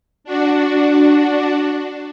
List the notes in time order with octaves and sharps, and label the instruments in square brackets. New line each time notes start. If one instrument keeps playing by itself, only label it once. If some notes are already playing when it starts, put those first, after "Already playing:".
[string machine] D4 F#4